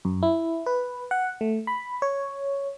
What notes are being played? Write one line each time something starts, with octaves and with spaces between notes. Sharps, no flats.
F#2
E4
B4
F#5
A3
B5
C#5